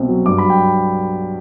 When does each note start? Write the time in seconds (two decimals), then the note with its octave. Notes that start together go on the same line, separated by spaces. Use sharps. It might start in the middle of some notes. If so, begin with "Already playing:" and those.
Already playing: C2 B2 C4
0.09 F#3
0.26 G2 D6
0.38 B5
0.44 F#3
0.50 G5